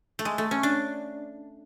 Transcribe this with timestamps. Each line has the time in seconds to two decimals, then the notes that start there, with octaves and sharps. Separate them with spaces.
0.19 A3
0.25 G#3
0.38 A3
0.51 C#4
0.63 D4